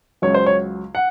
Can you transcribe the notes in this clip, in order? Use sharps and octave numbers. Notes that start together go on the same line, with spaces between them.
C#2 C#3 F#3 C#5
C5
C#5
F#5